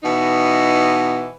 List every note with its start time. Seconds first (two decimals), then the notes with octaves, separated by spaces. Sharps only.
0.02 B2 E3 D#4